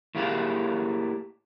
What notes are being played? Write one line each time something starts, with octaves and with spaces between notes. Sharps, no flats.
A2 A3 A#3 G4 G#4 F5